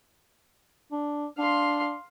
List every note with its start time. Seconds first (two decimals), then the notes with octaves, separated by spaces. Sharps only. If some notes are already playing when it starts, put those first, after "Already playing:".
0.92 D4
1.38 D4 F5 C6